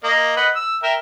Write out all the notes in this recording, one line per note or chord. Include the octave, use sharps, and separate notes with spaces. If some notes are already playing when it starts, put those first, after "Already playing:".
A#3 D#5
B4 D#5 F#5
E6
A#4 E5 G5